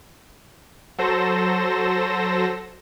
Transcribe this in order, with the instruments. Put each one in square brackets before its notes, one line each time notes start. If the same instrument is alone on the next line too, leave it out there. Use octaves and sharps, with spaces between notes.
[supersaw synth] F#3 A4 C5 A#6 E7